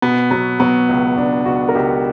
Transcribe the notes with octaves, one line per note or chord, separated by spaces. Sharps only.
B2 B3
F#3 B3
F#3 B3
C#2
C#2 D4
C#2 F#4
A#4
C#2 G4